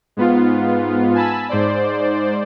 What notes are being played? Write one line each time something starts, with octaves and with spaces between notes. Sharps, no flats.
G#2 B3 F4
G#5 A5 B5 E6
G#2 C5 D5